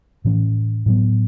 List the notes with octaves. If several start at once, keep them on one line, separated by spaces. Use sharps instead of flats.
A2 E3 C#4
A2 F#3 B3